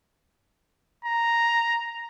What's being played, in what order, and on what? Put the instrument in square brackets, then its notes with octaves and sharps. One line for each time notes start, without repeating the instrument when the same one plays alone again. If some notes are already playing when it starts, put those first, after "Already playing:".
[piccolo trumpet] A#5